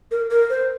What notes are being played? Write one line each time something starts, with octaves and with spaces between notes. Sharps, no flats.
A#4
A#4
C5